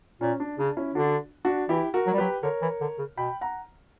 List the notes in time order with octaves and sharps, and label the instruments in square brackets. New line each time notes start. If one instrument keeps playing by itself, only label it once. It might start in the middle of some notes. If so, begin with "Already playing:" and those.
[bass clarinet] A#2 [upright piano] C#4
[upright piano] D4
[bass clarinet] C#3 [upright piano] D4
[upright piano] C#4 E4
[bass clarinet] D3 [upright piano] D4 F#4
[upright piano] D4 F#4
[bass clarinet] E3 [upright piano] E4 G4
[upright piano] F#4 A#4
[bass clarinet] F#3
G3
[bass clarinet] F#3 [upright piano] G4 B4
[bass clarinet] D3 [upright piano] A#4 C#5
[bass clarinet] E3
D3
C#3
[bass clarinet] B2 [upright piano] G5 B5
[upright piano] F#5 A#5